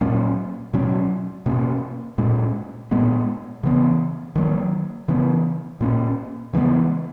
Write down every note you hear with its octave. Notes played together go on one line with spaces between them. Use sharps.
A#2 F#3 A#3 C#4
B2 F#3 C#4
B2 A#3 C#4
A#2 G#3 C#4
A#2 G#3 B3
C#3 E3 B3
D#3 F#3 A#3
C#3 E3 B3
A#2 A#3 C#4
C#3 E3 G#3 B3